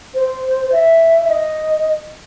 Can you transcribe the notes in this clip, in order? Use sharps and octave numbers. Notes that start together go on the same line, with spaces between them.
C5
E5
E5
D#5